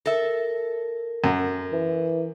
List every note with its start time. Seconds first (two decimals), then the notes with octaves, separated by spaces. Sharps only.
0.06 A4 A#4 E5
1.24 F#2
1.73 E3